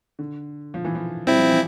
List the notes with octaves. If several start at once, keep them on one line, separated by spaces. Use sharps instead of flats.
D3
F3
E3
F3
G3 C4 E4
F3
E3